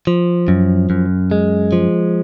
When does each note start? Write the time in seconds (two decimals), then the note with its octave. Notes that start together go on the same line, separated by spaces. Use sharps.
0.07 F3
0.48 F#2
0.90 F#2
1.31 G#3
1.72 F3